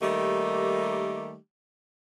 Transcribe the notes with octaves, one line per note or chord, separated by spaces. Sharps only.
D#3 G3 A3 A#3 D#4 G4